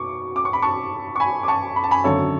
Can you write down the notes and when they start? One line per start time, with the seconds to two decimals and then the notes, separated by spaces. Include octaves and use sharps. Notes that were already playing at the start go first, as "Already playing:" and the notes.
Already playing: B2 C#6 D6
0.36 D6
0.45 C#6
0.53 B5
0.62 A5 C#6
1.16 C#6
1.20 G#5 B5
1.43 D6
1.48 A5 C#6
1.76 B5
1.84 A5
1.91 G#5 B5
2.04 G#1 F#2 D3 A4 C#5